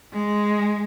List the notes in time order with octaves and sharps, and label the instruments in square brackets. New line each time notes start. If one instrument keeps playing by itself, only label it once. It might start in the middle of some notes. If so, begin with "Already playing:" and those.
[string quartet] G#3